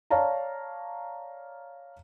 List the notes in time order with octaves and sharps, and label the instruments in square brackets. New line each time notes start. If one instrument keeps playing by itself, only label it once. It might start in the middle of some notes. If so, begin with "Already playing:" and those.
[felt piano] C#5 D5 F5 A5 A#5